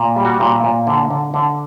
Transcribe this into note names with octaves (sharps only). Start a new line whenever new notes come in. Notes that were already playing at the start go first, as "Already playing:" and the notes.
Already playing: A#2
G3
F#4
A#2
A#2
D3
D3
D3